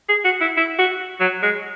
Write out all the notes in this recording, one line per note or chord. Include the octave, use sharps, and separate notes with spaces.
G#4
F#4
E4
E4
F#4
F#3
G#3